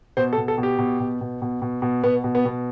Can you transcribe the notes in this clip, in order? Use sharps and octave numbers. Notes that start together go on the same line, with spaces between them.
B2 C5
A4
B2
A4
B2
G4
B2
B2
B2
B2
B2
B2
B2 B3
B2
B3
B2